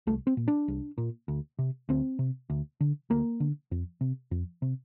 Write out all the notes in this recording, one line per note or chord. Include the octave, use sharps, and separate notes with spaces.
C2 A3
C4
A#2
D4
C2
A#2
D2
C3
D2 C4
C3
D2
D3
D2 A#3
D3
F2
C3
F2
C3